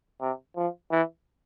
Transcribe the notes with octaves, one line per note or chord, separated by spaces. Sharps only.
C3
F3
E3